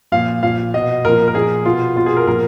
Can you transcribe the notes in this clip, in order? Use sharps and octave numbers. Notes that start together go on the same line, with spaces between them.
A#2 F3 F5
A#2 F3 F5
B2 D#5
A#2 F3 A#4
A#4
A#2 F3 G#4
B2 F4
B2 F4
G#4
A#4
A#2 F3 A#4